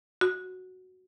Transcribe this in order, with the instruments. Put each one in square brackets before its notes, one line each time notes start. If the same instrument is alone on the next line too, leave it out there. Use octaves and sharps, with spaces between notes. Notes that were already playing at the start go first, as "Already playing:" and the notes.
[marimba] F#4